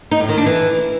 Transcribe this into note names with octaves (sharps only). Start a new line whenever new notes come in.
D#4
A2
D#3
D4
E3